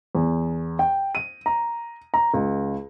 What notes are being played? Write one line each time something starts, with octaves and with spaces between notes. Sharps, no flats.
E2
G5
D#7
A#5
A#5
C#2